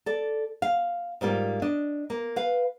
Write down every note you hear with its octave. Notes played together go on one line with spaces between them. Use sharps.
A4 D5
F5
G#2 G3 A#3 F4
D4 D#5
A#3
B4 F5